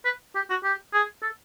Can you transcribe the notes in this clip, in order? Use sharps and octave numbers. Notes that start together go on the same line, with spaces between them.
B4
G4
F#4
G4
G#4
A4